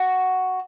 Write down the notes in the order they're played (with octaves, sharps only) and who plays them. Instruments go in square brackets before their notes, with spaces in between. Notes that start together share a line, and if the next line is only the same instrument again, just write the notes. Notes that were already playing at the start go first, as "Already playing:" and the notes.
Already playing: [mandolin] F#4